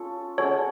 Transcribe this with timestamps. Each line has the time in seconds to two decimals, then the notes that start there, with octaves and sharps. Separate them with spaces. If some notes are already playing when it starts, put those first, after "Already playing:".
Already playing: C#4 F4 A4
0.38 G#3 C#4 F#4 A4 C#5